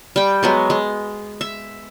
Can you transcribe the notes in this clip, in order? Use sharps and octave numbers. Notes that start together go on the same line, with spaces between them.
G3 G5
F#3 G#3 B3
G#3
E5